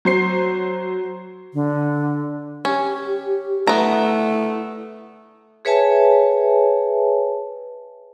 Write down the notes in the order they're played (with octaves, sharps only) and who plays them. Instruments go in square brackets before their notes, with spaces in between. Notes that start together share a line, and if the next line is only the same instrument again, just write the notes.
[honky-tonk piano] F#3 C5 C7
[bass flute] D3
[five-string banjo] C#4 [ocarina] G4
[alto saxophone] A3 [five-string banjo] B3 A#5 [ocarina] E4
[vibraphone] G#4 B4 C#5 E5 G#5 A5